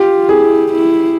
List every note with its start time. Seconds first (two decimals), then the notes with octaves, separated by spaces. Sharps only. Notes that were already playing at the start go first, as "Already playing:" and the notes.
Already playing: F4 G4
0.29 E4 G#4
0.72 E4